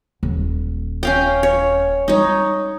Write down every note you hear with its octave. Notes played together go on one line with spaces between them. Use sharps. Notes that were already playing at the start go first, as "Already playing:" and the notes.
D#1
C#4 F5 G5
C#5
G3 D#4 C#5